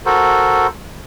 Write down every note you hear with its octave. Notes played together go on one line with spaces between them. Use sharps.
F#4 A4 A#4 C5